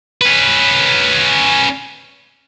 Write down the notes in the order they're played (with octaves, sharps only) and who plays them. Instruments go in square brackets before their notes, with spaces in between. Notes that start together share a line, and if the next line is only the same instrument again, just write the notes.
[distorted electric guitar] C#4 B4